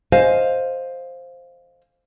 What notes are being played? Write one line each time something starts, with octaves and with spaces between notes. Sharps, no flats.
C5 D#5 F5 G#5